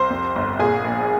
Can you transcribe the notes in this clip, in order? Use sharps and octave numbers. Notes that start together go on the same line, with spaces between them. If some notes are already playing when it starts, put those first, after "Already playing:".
Already playing: C2 C5 C6
F2
G1
A#2 G#4 G#5
A#1